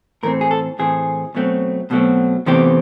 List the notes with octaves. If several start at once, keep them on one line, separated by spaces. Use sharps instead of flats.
A2 E3 A3 C4 A#4
G#4
A4
A2 E3 A3 C4 G#4
B2 F#3 A3 C4
B2 F#3 A3 C4
E2 C3 E3 A3 C4 G4